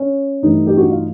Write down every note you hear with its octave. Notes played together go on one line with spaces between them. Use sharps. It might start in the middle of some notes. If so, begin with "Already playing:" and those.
Already playing: C#4
G2 E3 A3 D#4
G4
F#4
F4